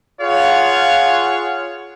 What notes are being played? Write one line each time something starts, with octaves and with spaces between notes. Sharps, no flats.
F4 G#4 C#5 F5 F#5